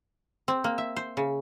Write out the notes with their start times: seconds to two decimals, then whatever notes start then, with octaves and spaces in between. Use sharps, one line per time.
0.48 C4
0.64 A#3
0.78 E5
0.96 C5
1.17 C#3